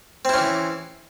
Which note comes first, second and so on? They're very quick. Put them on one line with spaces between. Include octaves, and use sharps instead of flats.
C4 E4 C#4 E3